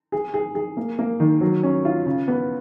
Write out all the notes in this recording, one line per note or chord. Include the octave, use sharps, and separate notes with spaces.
G#4
G#4
G#4
A#3
A#3
D#3
F#3
C#4
F4
C#3
B3